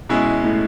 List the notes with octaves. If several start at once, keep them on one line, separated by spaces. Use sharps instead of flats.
B2 G#3 C#4 E4 G#4
A2